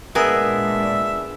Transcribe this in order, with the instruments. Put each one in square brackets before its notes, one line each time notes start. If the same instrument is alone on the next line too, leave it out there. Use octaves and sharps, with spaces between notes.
[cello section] A#2 G#3 D4 [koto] B3 G#4 A#4 [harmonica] E5